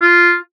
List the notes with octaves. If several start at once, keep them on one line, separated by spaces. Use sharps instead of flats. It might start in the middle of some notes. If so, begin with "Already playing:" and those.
F4